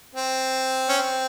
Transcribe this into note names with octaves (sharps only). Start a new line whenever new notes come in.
C4
C#4
C4